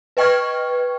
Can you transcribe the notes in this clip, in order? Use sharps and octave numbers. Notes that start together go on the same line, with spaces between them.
B4 D#5 G5 C#6 F6 G#6